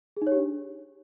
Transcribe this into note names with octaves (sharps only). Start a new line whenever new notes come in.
G#4
D#4
C#5
G4
D4